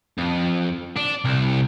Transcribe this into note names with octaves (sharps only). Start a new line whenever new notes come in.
F2
D4
C2